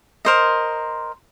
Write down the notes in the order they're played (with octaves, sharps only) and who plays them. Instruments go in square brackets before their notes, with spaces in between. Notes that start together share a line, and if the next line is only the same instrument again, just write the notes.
[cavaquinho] A#4 C5 D#5